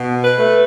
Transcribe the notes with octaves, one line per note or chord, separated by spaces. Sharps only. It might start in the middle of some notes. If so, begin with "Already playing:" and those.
Already playing: B2
B4
A3